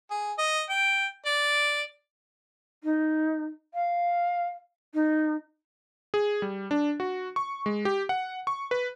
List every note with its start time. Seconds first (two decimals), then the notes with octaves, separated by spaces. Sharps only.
0.11 G#4
0.38 D#5
0.69 G5
1.26 D5
2.83 D#4
3.74 F5
4.94 D#4
6.14 G#4
6.42 G3
6.71 D4
7.00 F#4
7.36 C#6
7.66 G#3
7.85 G4
8.09 F#5
8.47 C#6
8.71 B4